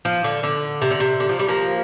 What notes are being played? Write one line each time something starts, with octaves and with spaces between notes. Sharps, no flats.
F3
D3
D3
C3
D3
C3
D3
F3
G3
F3 A#3